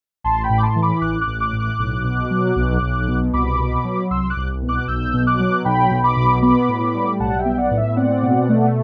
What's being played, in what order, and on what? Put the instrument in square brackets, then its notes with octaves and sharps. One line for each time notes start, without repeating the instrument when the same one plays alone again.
[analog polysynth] A1 A5 C6
G5 B5
A2
D6
A5 C6
E3
B5 D6
A1 D6 F#6
D6 F#6
A1
D6 F#6
A2
D6 F#6
B1
B2
F#3
B1
B1
B2
C2 B5 D6
B2
F#3
C2 C6 E6
D6 F#6
C2
B2
D6 F#6
B1 E6 G6
B2
D6 F#6
F#3
B1 G5 B5
B1
B5 D6
B2
B3 B5 D6
A2
G3
B1 F#5 A5
E5 G5
B3
D5 F#5
A2
E5
C4 D5 F#5
B2
A3